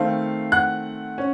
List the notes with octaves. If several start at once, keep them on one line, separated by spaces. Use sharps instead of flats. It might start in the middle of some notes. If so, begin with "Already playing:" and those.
Already playing: D#3 A3 C4 F5
F#5 F#6
C#4